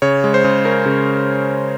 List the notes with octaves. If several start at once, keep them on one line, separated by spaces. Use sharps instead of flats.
C#3 C#5
G#3
C5
C#3
C#4 A#4
C#3